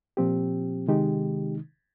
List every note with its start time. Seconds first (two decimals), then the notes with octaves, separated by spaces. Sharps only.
0.17 A#2 F3 C4 G4
0.88 C3 D#3 G#3 D#4 G4